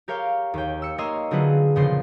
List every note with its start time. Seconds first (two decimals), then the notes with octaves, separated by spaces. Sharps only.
0.08 G4 A#4 C#5 F5 G5
0.54 D#2 G5
0.82 E6 C#7
0.98 A#3 A#4 C#5 D#5 C6 E6
1.31 D3 F#3 C4 F4 G#4 B4
1.76 F2 A#2 C#3 B3 C4 C6